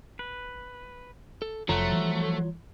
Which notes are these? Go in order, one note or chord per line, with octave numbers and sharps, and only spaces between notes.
B4
A4
F1 F3 F#3 A3 F4 C#5 F#5 A#5
E3 G3